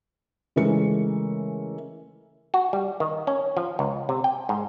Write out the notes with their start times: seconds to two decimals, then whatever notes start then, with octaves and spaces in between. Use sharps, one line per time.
0.56 C#3 E3 G#3 A3 A#4 C#7
2.54 F#4
2.73 G3
3.00 D#3
3.27 C#4
3.57 F3
3.79 C#2
4.09 C3
4.24 G5
4.49 G#2